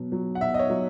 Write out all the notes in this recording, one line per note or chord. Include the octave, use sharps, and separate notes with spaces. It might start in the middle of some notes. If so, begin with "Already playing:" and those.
Already playing: B2 F#3
F#3
F#5
B2 E5
D#5
C#5
F#3